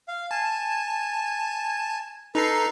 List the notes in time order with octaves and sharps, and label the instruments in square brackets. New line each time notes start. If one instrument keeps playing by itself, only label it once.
[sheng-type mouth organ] F5
[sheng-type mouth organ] G#5 [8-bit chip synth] A5
[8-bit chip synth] D#4 A#5 C7 [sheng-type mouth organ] A4 B4